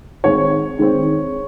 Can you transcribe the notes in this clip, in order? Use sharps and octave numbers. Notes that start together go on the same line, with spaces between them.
D#3 G#3 C4 C#5
D#3 G#3 C4